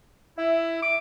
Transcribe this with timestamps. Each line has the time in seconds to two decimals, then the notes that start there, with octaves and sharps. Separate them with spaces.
0.38 E4 E5
0.82 D6